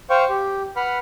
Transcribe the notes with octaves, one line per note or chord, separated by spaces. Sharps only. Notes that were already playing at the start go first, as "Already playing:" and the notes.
C5 F5 G5 C#6
G4
B4 F#5 B5 F6